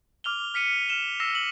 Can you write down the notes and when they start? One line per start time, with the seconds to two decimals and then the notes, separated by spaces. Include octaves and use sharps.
0.24 D6 F6 F7 G7
0.54 F6 B6 C#7 D#7 G7
0.89 F6 E7 G7
1.20 E6 A#6 C7 E7
1.35 F#7